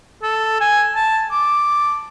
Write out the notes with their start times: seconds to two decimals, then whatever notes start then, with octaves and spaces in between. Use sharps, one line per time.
0.23 A4
0.61 G#5
0.96 A5
1.32 D6